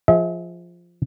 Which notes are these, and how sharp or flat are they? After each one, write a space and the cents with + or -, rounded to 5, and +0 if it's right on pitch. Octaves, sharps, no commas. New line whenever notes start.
F3 -5 G#4 +0 E5 -40